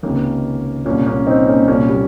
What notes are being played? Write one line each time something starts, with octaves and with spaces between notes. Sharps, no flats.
C#2 C3 D#3 A#3 C#4
C2 A#2 A#3 C#4
A#3 C#4
C4 D#4
A#3 C#4
C2 A#2 A#3 C#4
G3 A#3